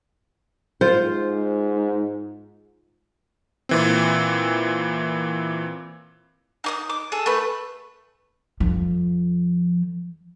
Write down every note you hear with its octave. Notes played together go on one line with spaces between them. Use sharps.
G#2 F4 C5
A#2 E3 C4
D#4 D6 D#6
D6
G#4 A4
A3 B4
F2 F3